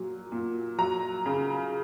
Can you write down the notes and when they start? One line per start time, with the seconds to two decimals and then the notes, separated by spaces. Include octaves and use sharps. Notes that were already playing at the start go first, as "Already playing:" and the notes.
Already playing: A#2 F#3
0.32 A#2
0.78 F#3 A#5
1.26 C#3